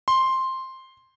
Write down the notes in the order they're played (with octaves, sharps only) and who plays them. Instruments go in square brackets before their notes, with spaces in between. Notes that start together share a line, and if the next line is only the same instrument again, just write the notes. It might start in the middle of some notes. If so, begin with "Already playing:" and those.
[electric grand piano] C6